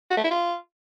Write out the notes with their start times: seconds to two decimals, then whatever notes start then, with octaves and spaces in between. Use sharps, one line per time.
0.11 F#4
0.17 A3
0.24 E4
0.31 F4